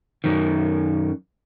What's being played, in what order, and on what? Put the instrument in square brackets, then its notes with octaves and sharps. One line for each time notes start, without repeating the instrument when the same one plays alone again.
[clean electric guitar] F#2 D#3